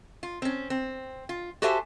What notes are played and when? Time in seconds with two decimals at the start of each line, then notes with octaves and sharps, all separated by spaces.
0.23 F4
0.42 C4 C#4
0.70 C4
1.29 F4
1.62 F#4 G4 A4 C5 E5 G#5